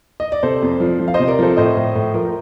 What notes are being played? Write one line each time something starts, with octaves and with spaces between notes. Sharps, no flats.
D#5
D5
C3 A4 C5
F2
F3
F3
F5
C5 D#5
C3
A#4 D5
F3 A4 C5
A2 C5 D#5
A2
A2
F3 A#4
A#4